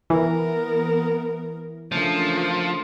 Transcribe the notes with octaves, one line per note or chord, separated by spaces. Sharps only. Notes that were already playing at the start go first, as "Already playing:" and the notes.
E3 B3 A#4
C#3 F3 A3 A#3 D4